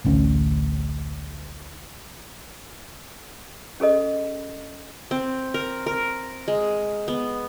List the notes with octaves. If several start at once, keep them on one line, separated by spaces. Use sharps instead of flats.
A1 D2 C#4
C#4 G#4 A4 D#5
C4
A#4
A#4
G#3
B3